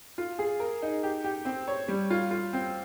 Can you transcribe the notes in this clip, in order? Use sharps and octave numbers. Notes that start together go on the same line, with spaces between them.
F4
G#4
A#4
D#4
G4
G4
C4
C#5
G3
F4
F4
C4